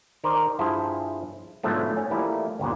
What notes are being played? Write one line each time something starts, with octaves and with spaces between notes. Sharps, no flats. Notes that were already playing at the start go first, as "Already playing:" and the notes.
D#3 A#4 C5 D5
G2 F3 E4 G#4 C5 A5
G#2 B2 D3 F3 F#3 A3
C#4
E3 F3 G3 A3 A#3 E4
G1 D2 A#2 B3